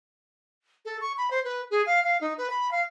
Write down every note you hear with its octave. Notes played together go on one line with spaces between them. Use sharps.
A4
C#6
B5
C5
B4
G#4
F5
F5
D#4
B4
B5
F5